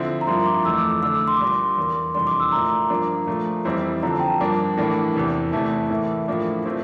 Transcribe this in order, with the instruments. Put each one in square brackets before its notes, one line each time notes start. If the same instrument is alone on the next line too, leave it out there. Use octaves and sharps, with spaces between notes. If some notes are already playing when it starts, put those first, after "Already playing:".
Already playing: [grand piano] D3 F3 C4 E4
[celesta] A#5
[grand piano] G2 F3 A#3 E4 [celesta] C6
[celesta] D6
[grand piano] F2 E3 A3 [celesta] E6
[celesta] D6
D6
[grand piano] D3 A3 D4 [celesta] E6
[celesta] D6
C6
[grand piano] A#2 G3 D4 [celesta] D6
[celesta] C6
[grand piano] E2 E3 A#3
[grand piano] F2 C3 E3 G3 D4 [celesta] C6
[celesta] D6
E6
[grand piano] A#2 A3 E4 [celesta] A#5
[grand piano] G2 F3 A#3 D4
A#2 F3 A3
F2 E3 G3 C4 E4
[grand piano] D3 F3 C4 [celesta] A#5
[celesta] A5
G5
A5
[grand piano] G2 F3 A#3 D4
A2 E3 A#3 D4
E2 C3 E3
[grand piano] E2 C3 E3 A3 E4 [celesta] A5
[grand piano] A2 E3 A#3 [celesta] E5
[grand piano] A2 F3 A#3 D4
A#2 F3 A3 C4 E4